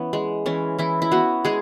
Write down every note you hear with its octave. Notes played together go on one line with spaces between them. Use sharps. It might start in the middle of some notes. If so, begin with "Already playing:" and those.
Already playing: E3 B3 C#4
G#3
E3 C#4
E3 E4
E4
B3 F#4
G#3 G#4